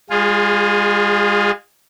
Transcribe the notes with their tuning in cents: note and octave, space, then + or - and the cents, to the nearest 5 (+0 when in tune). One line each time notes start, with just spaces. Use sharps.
G#3 -35 F4 +15 G#4 +0